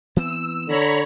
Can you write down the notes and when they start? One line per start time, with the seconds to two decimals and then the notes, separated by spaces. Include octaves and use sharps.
0.16 E3 B3 C4 E6
0.68 D3 C#5 A#5 B5